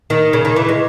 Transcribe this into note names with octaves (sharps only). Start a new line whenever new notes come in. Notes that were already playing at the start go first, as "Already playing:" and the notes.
D#3
C#3
D#3
E3
G#3